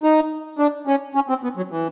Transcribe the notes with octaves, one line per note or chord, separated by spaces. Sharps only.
D#4
D4
C#4
C#4
C4
B3
F#3
E3